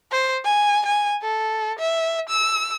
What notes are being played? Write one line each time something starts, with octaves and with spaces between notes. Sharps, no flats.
C5
G#5
G#5
A4
E5
E6